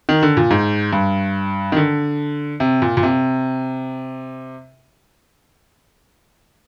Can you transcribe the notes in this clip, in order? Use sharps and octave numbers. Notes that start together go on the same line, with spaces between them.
D#3
D3
A#2
G#2
G2
D#3
D3
C3
A#2
A#2
C3